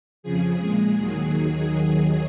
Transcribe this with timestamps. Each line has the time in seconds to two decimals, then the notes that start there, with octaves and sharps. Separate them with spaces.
0.23 F2 C#3 F3 G#4
0.59 A#2 G#3 G#4
0.96 D#2 D#3 F#3